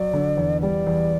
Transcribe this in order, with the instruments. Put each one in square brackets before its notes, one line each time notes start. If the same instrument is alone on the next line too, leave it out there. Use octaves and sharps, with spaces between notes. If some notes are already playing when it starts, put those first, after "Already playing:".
Already playing: [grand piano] F#3 [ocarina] D5
[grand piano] D3
E2
[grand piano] G3 [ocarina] D5
[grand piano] E2